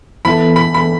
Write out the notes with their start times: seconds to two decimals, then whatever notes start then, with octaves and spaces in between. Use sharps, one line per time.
0.25 E3 B3 E4 A4 B5
0.56 B5
0.74 B5